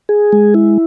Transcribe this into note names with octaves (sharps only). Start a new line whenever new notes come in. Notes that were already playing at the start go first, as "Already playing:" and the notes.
G#4
G#3
E4